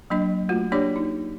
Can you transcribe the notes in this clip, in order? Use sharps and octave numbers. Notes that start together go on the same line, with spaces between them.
F#3 A#3 D4 D#5
A3 F4 F#4
A#3 D4 G4 C#5 D5 D6
D#4